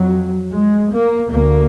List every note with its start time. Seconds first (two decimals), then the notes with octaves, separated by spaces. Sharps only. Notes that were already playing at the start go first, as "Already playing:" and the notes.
Already playing: F2 F#3
0.52 G#3
0.91 A#3
1.29 D2 A#3